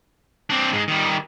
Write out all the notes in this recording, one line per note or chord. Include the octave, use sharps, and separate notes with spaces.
C4 D4
G#2 G#3
D#3 G3